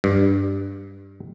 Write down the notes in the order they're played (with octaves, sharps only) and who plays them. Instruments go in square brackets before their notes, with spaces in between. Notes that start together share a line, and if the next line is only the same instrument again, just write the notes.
[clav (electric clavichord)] G2